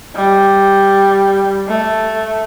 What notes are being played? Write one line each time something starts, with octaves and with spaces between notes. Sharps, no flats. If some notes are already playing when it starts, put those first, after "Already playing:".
G3
A3